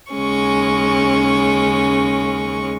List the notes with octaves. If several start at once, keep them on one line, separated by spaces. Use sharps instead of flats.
D#2 C#3 G#3 C#4 C#6